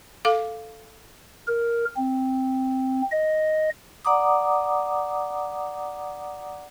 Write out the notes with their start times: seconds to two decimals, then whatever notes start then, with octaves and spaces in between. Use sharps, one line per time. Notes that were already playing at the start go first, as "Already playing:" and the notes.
0.25 A4 F5 D6
1.47 A#4
1.96 C4
3.12 D#5
4.05 D5 F#5 A#5 D6 D#6